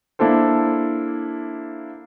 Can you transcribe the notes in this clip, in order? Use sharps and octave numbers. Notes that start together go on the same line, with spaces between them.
A#3 D4 E4 A4 C5